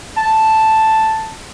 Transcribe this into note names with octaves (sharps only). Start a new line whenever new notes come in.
A5